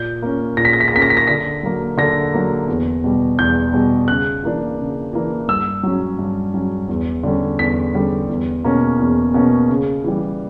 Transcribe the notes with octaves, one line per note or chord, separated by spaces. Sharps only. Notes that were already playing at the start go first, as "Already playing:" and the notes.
Already playing: A#2 G6
A#3 C#4
A#2 A#6
B6
A#6
B6
A#6
A#3 C#4 B6
A#6
B6
A#6
D3 B6
F#3 A#3
D3 A#6
F#3 A#3
E2
B2 G3
E2 G6
B2 G3
C#3 F#6
E3 A#3 D4
C#3
E3 A#3 D4
G2 E6
F#3 C#4
G2
F#3 C#4
E2
D3 G3 C#4
E2 B6
D3 G3 C#4
E2
B2 A#3 C#4
E2
B2 A#3 C#4
C#3
E3 G3